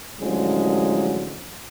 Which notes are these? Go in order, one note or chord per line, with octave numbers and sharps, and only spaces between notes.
A1 D3 F3 F#3 G#3